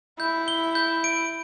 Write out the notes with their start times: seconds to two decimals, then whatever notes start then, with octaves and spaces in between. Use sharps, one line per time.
0.20 E4 G6
0.48 G7
0.75 G6
1.04 D7